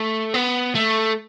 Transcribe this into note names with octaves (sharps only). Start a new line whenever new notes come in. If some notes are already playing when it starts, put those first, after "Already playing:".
Already playing: A3
B3
A3